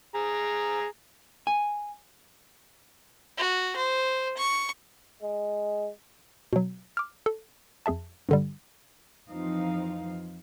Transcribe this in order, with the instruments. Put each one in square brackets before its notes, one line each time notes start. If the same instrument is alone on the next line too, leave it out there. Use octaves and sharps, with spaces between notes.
[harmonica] G#4 A#5
[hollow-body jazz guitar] G#5
[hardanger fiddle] F#4
C5
C#6
[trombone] G#3
[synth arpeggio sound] B2 F#3
D6 F6
A4
F2 G#4 E5 A5
G2 D3 G3
[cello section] F2 E3 F3 C4 D#4 F5